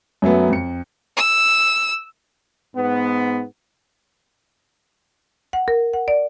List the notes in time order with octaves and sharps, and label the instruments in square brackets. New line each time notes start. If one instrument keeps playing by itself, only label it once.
[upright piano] F#2 F#3 A3 B3
F2 C#7
[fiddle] E6
[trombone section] G#2 B3
[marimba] F#5
A#4
F#5
D5